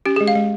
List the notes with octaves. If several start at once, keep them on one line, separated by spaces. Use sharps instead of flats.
C#4 G4
G#4
G#3
F5
G#3